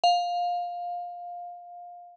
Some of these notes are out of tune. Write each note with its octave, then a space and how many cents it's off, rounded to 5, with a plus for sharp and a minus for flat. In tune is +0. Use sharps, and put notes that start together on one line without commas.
F5 +15